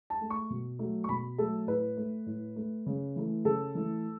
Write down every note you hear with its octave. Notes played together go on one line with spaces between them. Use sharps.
A5
A3
C#6
B2
F#3 A3
C#6
B2 B5
F#3 A3 A4
A2 B4
A3
A2
A3
C#3
E3 A3
C#3 A4
E3 A3